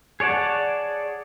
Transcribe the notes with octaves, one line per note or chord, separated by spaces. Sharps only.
G#4 C#5 D5 F#5 A5